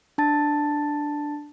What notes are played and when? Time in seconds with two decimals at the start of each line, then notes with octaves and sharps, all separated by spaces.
0.18 D4 A5 A6